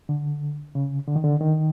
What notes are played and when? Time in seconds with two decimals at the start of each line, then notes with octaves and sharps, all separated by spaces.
0.09 D3
0.75 C#3
1.08 D3
1.16 D#3
1.24 D3
1.41 D#3